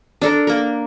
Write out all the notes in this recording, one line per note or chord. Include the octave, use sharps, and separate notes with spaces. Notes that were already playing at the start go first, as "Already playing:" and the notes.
D4 A4 A#4
A#3 A#4